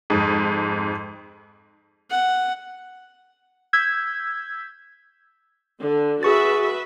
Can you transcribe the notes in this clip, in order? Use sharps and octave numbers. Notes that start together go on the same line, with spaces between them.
F2 G#2
F#5
E6 G6 G#6 B6
D3
F#4 G#4 B4 E5 C#6 A6